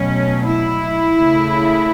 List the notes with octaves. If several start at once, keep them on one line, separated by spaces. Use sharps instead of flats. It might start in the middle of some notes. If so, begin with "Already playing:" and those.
Already playing: B2 F#3 A3 C#4
E4
C#3 A3